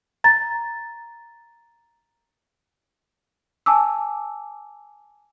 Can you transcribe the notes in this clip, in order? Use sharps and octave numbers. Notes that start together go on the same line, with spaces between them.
A#5 A6
G#5 A5 D6 E6